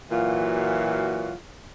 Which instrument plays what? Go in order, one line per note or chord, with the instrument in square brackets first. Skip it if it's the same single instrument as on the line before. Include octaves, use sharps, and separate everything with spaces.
[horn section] A#2 E3 F#3 F4 F#4 F5